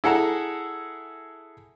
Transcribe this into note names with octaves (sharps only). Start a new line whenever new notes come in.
E4 G#4 A4 F#5 A#5